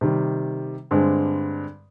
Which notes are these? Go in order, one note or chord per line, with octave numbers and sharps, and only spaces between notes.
C3 D#3 G3
G2 D3 G#3 C4